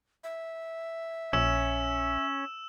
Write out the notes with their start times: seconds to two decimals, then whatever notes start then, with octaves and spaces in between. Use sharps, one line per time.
0.24 E5
1.33 A#1 C#4 E6 E7